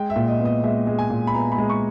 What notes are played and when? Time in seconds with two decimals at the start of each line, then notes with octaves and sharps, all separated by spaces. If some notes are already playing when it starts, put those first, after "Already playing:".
Already playing: G#3 G5
0.10 E5
0.16 A#2
0.28 D#5
0.40 B3
0.45 D#5
0.64 G#3 E5
0.87 G#3
0.99 G#5
1.10 A#2
1.27 B5
1.34 B3 A#5
1.52 B5
1.58 G#3
1.70 C#6